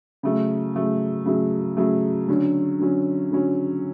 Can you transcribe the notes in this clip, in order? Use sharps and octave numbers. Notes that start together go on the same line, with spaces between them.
C#3 F#3 A3
C#3 F#3 A3
C#3 F#3 A3
C#3 F#3 A3
D3 F#3 C#4
D3 F#3 C#4
D3 F#3 C#4